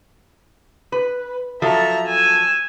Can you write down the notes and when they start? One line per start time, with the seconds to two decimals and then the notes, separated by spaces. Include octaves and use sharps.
0.92 B4
1.62 F3 F#3 A4 E5 A#5
2.07 G#5 E6